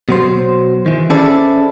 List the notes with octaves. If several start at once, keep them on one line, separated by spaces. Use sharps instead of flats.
B2 F#3 C5
D#3 E3
C#4 E4 G#4 A4 C5 D5